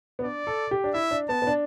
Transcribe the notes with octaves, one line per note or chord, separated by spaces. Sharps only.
B3
D4 D5
A4
G4
D4
E4 E5
D4
B3 A5
B3
D4